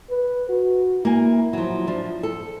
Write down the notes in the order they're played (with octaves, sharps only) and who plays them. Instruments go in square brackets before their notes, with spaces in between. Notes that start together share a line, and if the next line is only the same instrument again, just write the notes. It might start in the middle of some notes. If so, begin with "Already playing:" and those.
[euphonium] B4
F#4
[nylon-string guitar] A#3 G#5 [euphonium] E4
[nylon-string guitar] F3 F#3
F3 D4
A4